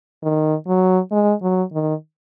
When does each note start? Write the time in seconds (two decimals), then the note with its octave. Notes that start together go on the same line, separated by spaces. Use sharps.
0.23 D#3
0.67 F#3
1.12 G#3
1.42 F#3
1.73 D#3